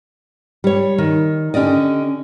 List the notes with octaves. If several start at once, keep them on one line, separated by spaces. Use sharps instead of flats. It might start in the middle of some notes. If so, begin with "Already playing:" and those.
G3 C#5
D#3
D3 C#4 G4 D5 D#5